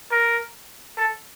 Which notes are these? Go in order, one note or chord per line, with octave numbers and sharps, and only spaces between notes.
A#4
A4